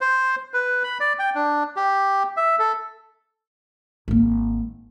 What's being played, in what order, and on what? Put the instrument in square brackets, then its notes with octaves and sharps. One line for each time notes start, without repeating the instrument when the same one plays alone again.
[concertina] C5
B4
B5
D5
G5
D4
G4
E5
A4
[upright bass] G#1 A#3